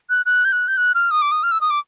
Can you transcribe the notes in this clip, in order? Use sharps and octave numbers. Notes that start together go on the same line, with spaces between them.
F#6
F#6
G6
F#6
G6
F#6
F6
D#6
D6
D#6
F6
E6
D#6
D6